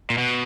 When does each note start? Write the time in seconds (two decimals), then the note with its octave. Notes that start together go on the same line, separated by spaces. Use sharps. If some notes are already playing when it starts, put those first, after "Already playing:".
0.10 A#2
0.18 B2